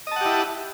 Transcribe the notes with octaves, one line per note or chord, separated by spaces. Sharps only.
E4 G4 D#5 F#5 A5